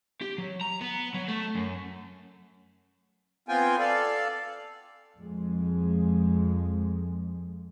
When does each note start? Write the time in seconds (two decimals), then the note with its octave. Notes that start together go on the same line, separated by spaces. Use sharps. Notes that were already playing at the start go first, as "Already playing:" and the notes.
0.22 G4
0.38 F#3
0.61 A#5
0.81 B3
1.14 F#3
1.28 A3
1.55 F#2
3.49 B3 C4 F4 G5 G#5
3.79 A4 D5 F5
5.16 F2 G#3